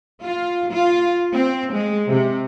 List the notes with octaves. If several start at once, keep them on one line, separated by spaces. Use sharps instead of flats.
F4
F4
C4
G#3
C3